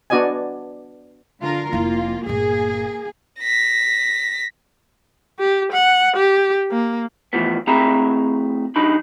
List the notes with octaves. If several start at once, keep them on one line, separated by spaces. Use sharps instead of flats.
B3 D4 F#4 D5 D#5 G#5
D3 F4 A#4
F1 A#3 E4 F4
G1 A#2 A#3 G#4
A#6 B6
G4
F#5
G4
A#3
A2 E3 F3 B3
A2 C4 G#4 E5 A#5 B5
F#3 D4 D#4 B5